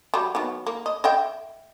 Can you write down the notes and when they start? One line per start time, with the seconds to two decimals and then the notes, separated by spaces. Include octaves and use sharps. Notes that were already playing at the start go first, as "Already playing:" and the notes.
0.14 F#3 G3
0.35 D#3 F#3 B3
0.67 A#3
0.86 D#5
1.04 D#5 E5 G5